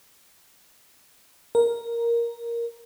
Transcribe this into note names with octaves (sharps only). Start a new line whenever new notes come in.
A#4